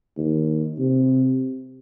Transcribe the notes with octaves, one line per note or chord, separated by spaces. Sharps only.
D#2
C3